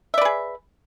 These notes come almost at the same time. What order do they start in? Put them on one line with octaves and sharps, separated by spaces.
E5 D5 B4 G#4